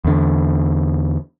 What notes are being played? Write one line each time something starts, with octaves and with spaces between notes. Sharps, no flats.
E2 D3